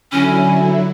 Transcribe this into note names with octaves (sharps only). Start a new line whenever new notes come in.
D3 F#3 C#4 E4